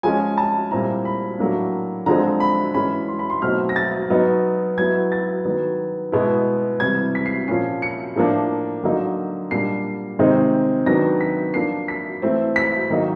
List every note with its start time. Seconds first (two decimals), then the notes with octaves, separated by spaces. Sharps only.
0.03 F3 G#3 C#4 G#5
0.37 A5
0.71 A#2 G3 C4 E4 A#5
1.05 B5
1.39 A2 F#3 A#3 D4
2.06 D3 F3 G#3 C4 A#5
2.40 B5
2.74 E3 G#3 C#4 B5
3.08 C6
3.19 B5
3.30 C6
3.42 B2 F#3 A3 C4 D#4 F6
3.69 A#6
3.76 A6
4.10 F#3 B3 D#4
4.78 F#3 B3 E4 G#6
5.12 A6
5.45 D#3 F#3 B3
6.12 B2 G#3 B3 E4
6.80 C3 E3 G3 G#6
7.15 B6
7.26 C7
7.48 A#2 F3 A#3 C#4 C7
7.82 C#7
8.16 A2 F3 A#3 D4
8.84 D3 F#3 A#3 D#4
9.51 A#2 G3 A#3 D4 C7
10.19 C3 D#3 G#3 C4 D#4
10.86 D#3 F#3 B3 D4 A#6
11.21 B6
11.54 F3 A#3 D4 C7
11.88 B6
12.22 E3 A3 C4
12.56 B6
12.90 D#3 F#3 A#3 D#4